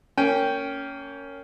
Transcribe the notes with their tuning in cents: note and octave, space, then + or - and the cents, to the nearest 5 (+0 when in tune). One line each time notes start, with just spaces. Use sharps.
A#3 -20 C#4 +10 G5 +0